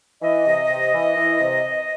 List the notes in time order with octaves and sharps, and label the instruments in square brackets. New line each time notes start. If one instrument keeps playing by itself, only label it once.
[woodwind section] E3 D#5
C3
C3
E3
E3
C3